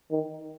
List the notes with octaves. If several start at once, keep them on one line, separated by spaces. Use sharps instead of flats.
D#3